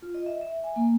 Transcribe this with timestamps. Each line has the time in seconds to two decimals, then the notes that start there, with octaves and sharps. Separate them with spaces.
0.02 F4
0.15 D#5
0.26 E5
0.41 E5
0.64 G#5
0.76 A#3